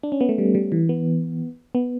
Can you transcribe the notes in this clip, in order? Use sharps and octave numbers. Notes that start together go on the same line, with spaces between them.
D4
C#4
B3
A3
G3
G3
E3
B3
B3